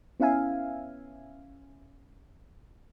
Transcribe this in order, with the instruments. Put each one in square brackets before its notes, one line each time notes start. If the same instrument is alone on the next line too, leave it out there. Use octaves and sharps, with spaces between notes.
[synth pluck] B3 C#4 E4 E5 F5 G#5